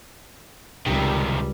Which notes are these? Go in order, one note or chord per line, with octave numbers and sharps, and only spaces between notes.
C#2 C3 D#3 G3